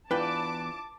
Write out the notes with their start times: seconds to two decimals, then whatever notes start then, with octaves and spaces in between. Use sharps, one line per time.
0.11 E2 D4 E4 F4 B4 G5 A5 D6